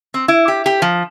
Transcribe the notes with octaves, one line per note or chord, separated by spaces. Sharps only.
C4
E4
G4
G4
F3